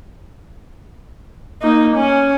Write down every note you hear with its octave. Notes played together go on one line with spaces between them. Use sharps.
A#3 D#4
C#4